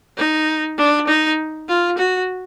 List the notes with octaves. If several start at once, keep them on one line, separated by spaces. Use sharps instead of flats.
D#4
D4
D#4
F4
F#4